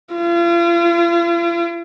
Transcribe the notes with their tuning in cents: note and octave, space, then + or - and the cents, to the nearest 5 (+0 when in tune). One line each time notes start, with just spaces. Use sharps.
F4 -40